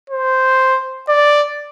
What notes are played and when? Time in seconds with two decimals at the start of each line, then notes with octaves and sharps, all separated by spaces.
0.10 C5
1.08 D5